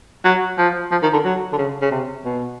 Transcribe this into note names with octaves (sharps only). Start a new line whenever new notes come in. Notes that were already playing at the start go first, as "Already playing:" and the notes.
F#3
F3
F3
D#3
D3
F#3
D3
C#3
C#3
C3
B2